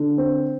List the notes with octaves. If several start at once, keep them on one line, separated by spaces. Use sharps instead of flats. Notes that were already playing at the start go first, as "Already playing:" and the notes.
Already playing: D3
C4